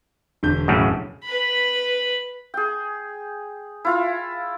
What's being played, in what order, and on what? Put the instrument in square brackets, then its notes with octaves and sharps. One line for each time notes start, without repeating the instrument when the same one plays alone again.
[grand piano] E1 D3 G6
[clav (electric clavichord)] F#2 A2 C#3
[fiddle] B4 B5
[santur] G#4 G5
E4 F4 F5